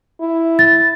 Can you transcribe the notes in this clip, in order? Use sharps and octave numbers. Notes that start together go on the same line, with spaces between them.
E4
A6